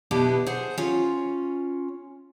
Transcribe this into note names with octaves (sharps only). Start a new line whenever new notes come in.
B2 B3 D4 E4 G4
G#4 C5 F#5
C#4 F4